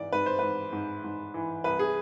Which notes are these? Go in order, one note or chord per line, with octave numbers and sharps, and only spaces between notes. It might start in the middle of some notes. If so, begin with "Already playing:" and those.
Already playing: G#2 E3 D5
G#2 B4
C5
G#2 B4
G#2
G#2
E3
C2 B4
G#4